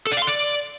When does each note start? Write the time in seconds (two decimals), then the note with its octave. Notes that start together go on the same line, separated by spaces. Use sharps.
0.07 A4
0.12 D5
0.17 F5
0.22 C6
0.27 D5